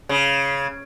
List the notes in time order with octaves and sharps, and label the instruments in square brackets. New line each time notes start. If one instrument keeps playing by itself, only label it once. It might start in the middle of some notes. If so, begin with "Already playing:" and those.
[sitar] C#3